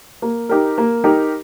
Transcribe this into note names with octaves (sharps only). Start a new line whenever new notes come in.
A#3
D#4 G4 A#4
A#3
D#4 G4 A#4